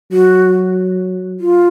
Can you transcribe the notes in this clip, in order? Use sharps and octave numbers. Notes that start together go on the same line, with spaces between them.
F#3 F#4
F4